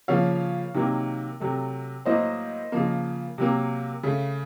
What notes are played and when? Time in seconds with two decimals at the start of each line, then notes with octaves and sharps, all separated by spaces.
0.08 C#3 F3 A#3 C#5 F5
0.74 C3 D#3 F#3 A#3
1.40 C3 F#3 A3
2.05 A2 F#3 A#3 C5 D#5
2.72 C#3 F3 A#3
3.38 C3 F#3 A#3
4.03 C#3 A3